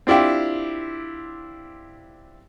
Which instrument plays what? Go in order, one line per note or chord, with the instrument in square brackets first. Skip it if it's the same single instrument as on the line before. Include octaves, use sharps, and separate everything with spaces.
[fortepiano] C4 D4 E4 F4 G4